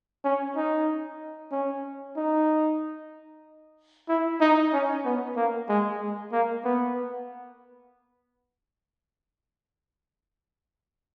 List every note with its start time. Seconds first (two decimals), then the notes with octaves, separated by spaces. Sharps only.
0.24 C#4
0.56 D#4
1.52 C#4
2.16 D#4
4.09 E4
4.41 D#4
4.73 C#4
5.05 B3
5.37 A#3
5.69 G#3
6.01 G#3
6.32 A#3
6.65 B3